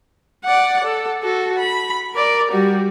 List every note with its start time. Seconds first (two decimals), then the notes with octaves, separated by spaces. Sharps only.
0.45 D5 F#5
0.84 A4
1.23 F#4 A4
1.59 B5
2.15 A#4 D5
2.51 G3 F#4